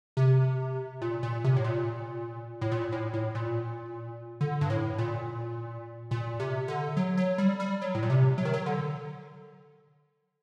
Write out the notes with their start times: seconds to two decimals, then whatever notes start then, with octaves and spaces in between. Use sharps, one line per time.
0.17 C3
1.02 A#2
1.23 A#2
1.44 C3
1.56 A2
1.64 A#2
2.61 A2
2.72 A#2
2.92 A2
3.14 A2
3.35 A#2
4.41 D3
4.61 G2
4.70 A2
4.98 A#2
6.11 A#2
6.40 C3
6.68 D3
6.97 F#3
7.17 F#3
7.38 G3
7.60 G3
7.82 F#3
7.95 A2
8.03 A#2
8.10 C3
8.38 F#3
8.45 D#3
8.54 F#3
8.66 D3